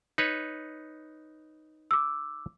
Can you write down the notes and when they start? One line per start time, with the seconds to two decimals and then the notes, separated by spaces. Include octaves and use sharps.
0.18 D#4 B4 C#5
1.91 D6 E6